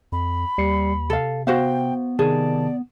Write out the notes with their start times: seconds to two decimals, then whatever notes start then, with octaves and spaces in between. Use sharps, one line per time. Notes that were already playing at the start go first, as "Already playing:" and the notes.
0.12 F2 B5
0.58 D#2 G3 C7 C#7
1.10 C3 A4 F5
1.47 B3 F#4 C5 F5 G5
2.19 C3 D#3 G#4 D5 A5